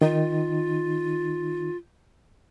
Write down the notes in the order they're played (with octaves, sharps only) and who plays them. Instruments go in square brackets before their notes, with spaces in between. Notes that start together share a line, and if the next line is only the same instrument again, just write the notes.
[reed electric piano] D#3 D#4 [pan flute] F4